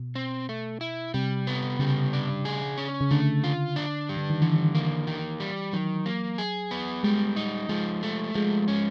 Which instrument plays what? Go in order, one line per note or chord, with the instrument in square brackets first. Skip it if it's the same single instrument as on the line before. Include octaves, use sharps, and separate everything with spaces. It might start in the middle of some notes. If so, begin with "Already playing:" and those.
Already playing: [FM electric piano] B2
[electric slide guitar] C4
A3
E4
[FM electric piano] C3 [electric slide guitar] G3
[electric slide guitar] B3
[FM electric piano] C#3 [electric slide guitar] G3
[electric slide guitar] D4
G#4
C#4
[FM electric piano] C#3
[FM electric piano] D3 [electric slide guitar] A3
[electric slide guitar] F4
D4
G3
[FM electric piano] D3
D#3
[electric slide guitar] D3 [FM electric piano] E3
[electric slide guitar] A#3
D#3
G3
[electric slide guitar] D#3 [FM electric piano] F#3
[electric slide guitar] A#3
G#4
B3
[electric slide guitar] G3 [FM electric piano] G#3
[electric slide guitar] D#4
[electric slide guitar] F3 [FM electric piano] G#3
[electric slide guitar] A3
[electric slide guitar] F3 [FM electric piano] G#3
[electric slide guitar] C#4